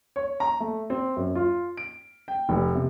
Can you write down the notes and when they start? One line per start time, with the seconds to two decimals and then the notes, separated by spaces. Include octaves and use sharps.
0.16 C#5
0.40 A#5
0.60 A3
0.90 C4
1.17 F#2
1.35 F4
1.77 D7
2.28 G5
2.49 F1
2.75 C3